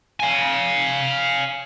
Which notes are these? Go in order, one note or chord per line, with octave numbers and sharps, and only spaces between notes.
F5 G#5